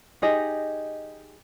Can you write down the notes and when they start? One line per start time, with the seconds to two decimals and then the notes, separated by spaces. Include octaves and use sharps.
0.22 D#4 G4 G#4 D#5